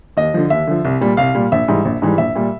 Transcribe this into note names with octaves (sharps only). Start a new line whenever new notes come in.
D#2 D#5
D3 F3
D#2 E5
D3 F3
C2
A#2 G3
C2 F5
A#2 G3
A#1 E5
G#2 E3 G3
A#1
G#2 E3 G3
A#1 E5
A#2 G3